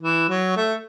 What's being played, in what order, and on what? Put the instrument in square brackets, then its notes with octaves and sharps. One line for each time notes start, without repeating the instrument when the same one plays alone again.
[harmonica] E3
F#3
A3